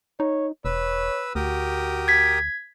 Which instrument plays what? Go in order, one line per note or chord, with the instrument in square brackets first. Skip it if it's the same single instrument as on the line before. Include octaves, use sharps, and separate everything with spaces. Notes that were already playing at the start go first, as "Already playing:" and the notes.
[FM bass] D#4 [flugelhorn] C#5
[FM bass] E1 [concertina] B4 E6 [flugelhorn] C#5
[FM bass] D2 [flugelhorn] F#4 [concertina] G4 A#4 D#6
[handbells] G#6 B6